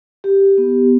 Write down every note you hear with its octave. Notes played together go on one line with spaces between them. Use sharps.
G4
B3